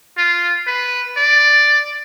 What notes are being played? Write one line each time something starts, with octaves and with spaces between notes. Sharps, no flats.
F4
B4
D5